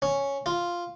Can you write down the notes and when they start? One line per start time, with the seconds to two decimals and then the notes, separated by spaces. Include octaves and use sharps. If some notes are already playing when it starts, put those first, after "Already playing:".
0.02 C#4
0.46 F4